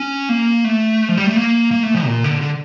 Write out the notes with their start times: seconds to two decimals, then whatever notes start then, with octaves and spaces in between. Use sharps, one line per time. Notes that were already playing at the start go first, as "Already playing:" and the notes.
Already playing: C#4
0.29 A#3
0.64 A3
1.09 F3
1.17 G3
1.27 A3
1.36 A#3
1.71 A#3
1.83 A3
1.94 F3
2.06 A#2
2.24 D3
2.41 D3